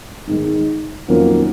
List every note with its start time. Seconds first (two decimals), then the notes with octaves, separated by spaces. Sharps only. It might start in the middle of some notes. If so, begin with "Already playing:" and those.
0.27 G#2 D#3 G#3
1.08 F2 D#3 F#3 A#3 C#4